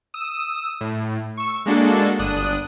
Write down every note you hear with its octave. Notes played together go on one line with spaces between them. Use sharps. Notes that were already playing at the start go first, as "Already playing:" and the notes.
D#6 E6
A2
C#6 E6
G#3 A#3 D4 F#4 A4
G1 D4 D#6 F#6